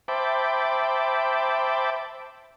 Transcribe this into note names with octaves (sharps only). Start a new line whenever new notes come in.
C5 E5 G5 A5 B5 D6